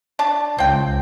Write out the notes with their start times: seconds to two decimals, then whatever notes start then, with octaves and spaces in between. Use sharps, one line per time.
0.19 D4 A5
0.58 C#2 C4 G5